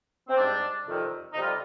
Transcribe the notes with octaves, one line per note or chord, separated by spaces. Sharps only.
C4
G#2 G3 D4
F2 C3 D#3 G3
F2 C3 G3 D#4
F4